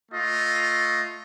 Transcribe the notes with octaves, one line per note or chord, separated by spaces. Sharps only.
A3 F4 D#5